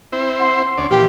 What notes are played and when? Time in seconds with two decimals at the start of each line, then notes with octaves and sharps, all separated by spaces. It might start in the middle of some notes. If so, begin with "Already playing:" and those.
0.12 C4 E4 C5
0.40 F#5 C6 C7
0.78 D2 C#4 D5
0.91 A#2 E3 F3 G4